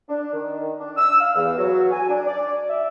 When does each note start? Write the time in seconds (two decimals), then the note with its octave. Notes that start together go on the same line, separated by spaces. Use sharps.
0.09 D4
0.32 D#3
0.79 D4
0.97 E6
1.20 F5
1.35 E2
1.58 F#3
1.91 G#5
2.09 D4
2.26 D5
2.69 E5